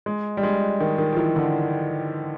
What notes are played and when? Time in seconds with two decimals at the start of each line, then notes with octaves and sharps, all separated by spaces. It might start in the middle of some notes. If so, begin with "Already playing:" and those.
0.06 G#3
0.37 G3
0.43 G#3
0.80 D#3
0.98 D#3
1.12 F3
1.17 E3
1.36 D3